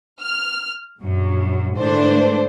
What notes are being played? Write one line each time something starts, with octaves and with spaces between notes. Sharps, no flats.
F6
A#1 F#2
G#2 D3 E3 A3 D4 C5